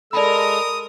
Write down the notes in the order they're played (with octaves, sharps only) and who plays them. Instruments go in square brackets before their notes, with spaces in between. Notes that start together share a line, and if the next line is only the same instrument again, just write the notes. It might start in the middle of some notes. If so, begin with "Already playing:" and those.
[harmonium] G#3 A4 [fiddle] A#4 A#5 [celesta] D5 B5 [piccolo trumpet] D#6